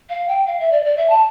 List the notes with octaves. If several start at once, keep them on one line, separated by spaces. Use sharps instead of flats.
F5
G5
F5
E5
D5
D5
E5
A5